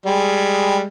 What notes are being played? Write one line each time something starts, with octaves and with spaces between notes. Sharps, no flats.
G3 G#3